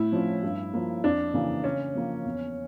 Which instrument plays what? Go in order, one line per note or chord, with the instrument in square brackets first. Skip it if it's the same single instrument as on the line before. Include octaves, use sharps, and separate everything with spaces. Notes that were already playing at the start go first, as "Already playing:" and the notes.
Already playing: [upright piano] A2 E4
F3 C#4
G2
F3 A#3
F2 D4
C#3 E3 A#3
C#3 C#4
F3 A#3
E2